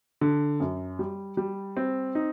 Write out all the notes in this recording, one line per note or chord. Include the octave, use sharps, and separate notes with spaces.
D3
F#2
G3
G3
C4
D#4